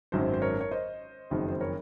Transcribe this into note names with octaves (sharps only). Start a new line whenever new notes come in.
G#1 F#2 D#3 F#3 C5
C5
A#4 C#5
C#5
C5 D#5
F#1 F2 D#3 F#3
C5
A#4 C#5